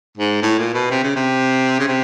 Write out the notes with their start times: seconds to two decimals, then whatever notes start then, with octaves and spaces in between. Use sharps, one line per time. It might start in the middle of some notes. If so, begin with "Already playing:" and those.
0.17 G#2
0.42 A2
0.59 A#2
0.74 B2
0.91 C3
1.03 C#3
1.16 C3
1.79 C#3
1.88 C3